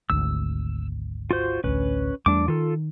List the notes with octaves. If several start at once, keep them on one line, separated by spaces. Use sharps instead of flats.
G#1 D2 E6
F4 F#4 C5
A1 D2 C#4 B4
E2 G3 A3 D4 D6
D#3 F4 A4